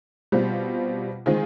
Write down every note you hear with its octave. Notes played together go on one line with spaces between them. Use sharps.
B2 G3 C4 F4
D#3 G#3 C4 F4 G#4